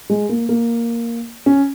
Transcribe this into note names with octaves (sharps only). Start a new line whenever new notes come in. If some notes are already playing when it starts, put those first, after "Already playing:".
G#3
A#3
A#3
C#4